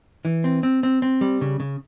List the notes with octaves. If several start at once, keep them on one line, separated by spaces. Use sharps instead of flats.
E3
C4
C4
C4
C4
G3
C#3
C#3